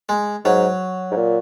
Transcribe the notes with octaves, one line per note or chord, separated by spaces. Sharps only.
G#3
G#2 F#3
G#2
A#2